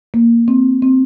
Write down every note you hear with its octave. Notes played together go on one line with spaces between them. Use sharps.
A#3
C4
C4